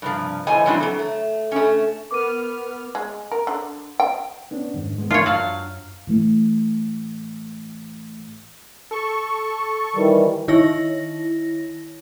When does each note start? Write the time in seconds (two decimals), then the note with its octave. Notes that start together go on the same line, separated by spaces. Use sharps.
0.02 G2 C3 F3
0.47 A2 E3 C5 D#5 G#5
0.66 E3 F#3 G3 C4 D4 E4
0.80 F#3 A4
0.99 A3
1.52 A3 C#4
2.11 B3 A#4 D6 F6 D#7
2.95 G#3
3.32 A#4
3.47 D3
4.00 G5
4.51 B3 C#4 D4
4.74 F2 G#2 D#3
4.98 G#2 G#3 B3
5.11 F4 C#5
5.26 F#2 F#3 D4 F5
6.07 A2 E3 A3
8.91 A4 C#6
9.95 D#3 E3 G3
10.48 D#3 E4 C#5 A#6